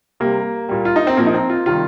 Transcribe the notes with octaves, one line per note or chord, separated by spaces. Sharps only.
C3 G3 A#3
A#2 G3
F4
D#4
C4
A#2 F3 A#3
D#4
C4
F4
C3 D#3 G3 F4